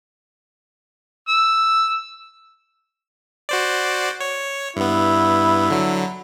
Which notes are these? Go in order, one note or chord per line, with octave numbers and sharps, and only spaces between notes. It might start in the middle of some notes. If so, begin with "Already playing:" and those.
E6
F#4 C5 D5
C#5
G2 B3 E4
D3 F#3